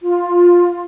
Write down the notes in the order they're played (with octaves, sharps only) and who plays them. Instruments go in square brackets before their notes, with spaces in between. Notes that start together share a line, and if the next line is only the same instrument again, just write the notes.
[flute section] F4